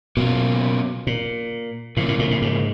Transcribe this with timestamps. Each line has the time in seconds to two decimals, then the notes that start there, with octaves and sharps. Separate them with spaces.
0.17 B2 F#3 A#3 C#4 F4
1.07 A#2
1.97 A2 C#3 F3 A#3
2.08 A2
2.19 A2
2.31 A2
2.42 G#2